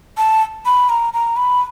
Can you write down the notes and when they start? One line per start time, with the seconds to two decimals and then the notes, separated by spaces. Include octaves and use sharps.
0.17 A5
0.66 B5
0.89 A#5
1.13 A#5
1.36 B5